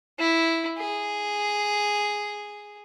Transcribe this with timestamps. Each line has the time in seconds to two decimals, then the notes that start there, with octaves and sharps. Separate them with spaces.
0.19 E4
0.78 G#4